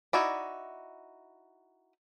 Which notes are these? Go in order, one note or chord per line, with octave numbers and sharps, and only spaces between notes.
D#4 E4 F#4 D5